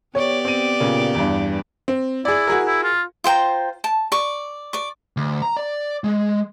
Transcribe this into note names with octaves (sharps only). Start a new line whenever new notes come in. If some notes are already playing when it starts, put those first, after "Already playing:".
B3 G4 C#5 D5
C4 D#7
A#2 C#3 A#3
E2 G2
C4
E4 G#4 D5
F#4 G#4 A#4
E4
F4
F4 C5 G5 A#5
A5
D5 C#6
D5 C#6
D2
A#5
D5
G#3